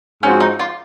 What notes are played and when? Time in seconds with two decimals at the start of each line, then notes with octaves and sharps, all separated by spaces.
0.23 G#2 F3 C4 C#4 F#4
0.40 D#4
0.59 F4